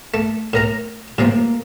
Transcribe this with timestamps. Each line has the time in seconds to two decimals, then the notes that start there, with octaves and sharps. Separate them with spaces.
0.14 A3
0.53 A2 A#4 A#5
1.18 A2 C3 F3 A#3